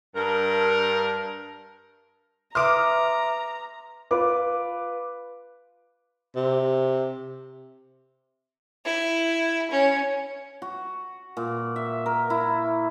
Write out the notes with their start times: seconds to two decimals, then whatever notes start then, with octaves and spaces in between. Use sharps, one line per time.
0.16 G2 A#4
2.55 B4 E5 A#5 C6 D6 D#6 F6 D7
4.11 F4 B4 D6
6.36 C3
8.85 E4
9.71 C#4
10.62 F#4
11.37 A#2
11.76 E5
12.06 A#4
12.30 E4